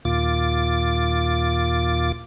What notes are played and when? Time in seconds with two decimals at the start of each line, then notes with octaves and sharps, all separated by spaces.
0.05 D#2 A#2 F4 D6 A6